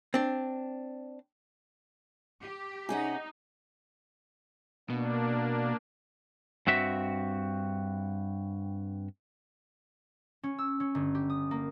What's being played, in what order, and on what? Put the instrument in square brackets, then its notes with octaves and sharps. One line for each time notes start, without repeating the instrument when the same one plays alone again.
[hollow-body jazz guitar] C4 D4
[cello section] G4
[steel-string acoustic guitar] C3 C#4 F#5 [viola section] D#4 [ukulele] G#4
[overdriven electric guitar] B2 [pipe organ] A#3 D4
[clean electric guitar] G2 C4 F#4 E5
[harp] C#4
E6
C#4
G1
G4
D#6
A#3